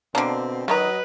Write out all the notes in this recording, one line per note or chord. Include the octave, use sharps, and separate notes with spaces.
B2 D3 A#3 C4 D4
D#3 E3 F#3 B4 D#5 A#5